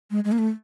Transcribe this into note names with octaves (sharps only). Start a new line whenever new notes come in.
G#3
G#3
A#3
A3